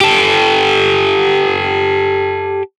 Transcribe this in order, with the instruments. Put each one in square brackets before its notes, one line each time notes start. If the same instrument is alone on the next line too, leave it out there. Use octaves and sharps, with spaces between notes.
[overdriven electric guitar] G4 A4